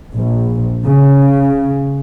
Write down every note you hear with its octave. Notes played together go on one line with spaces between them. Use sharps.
A#1
C#3